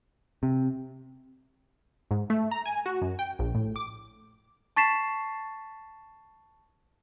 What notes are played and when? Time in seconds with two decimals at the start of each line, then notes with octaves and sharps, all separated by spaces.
0.43 C3
2.11 G#2
2.30 A3
2.51 A#5
2.66 G#5
2.86 F#4
3.01 F#2
3.19 G5
3.39 A#1
3.55 A2
3.76 D6
4.76 A5 C#6 A6 B6 C7 E7